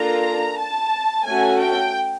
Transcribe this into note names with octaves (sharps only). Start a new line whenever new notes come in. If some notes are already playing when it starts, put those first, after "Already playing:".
Already playing: A#3 D4 F4 A4 A#5
A5
A3 C#4 F#4 A4 G#5
G5